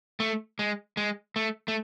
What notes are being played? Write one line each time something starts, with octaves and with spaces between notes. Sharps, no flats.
A3
G#3
G#3
A3
A3